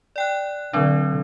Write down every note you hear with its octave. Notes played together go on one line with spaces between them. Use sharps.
D5 G5 F#6
D3 F#3 C4 D4